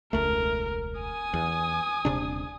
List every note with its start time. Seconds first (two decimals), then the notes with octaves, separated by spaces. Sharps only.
0.13 E1 C#2 A3 A#4
1.01 G#5 D#6
1.34 E2
2.05 D#1 C3 D4